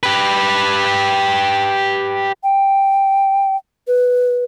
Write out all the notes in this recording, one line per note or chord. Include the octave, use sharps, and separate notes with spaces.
G4 B4
G5
B4